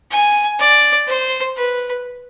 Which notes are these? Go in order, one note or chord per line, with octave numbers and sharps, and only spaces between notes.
G#5
D5
C5
B4